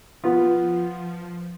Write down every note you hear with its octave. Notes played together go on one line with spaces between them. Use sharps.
F3 B3 F4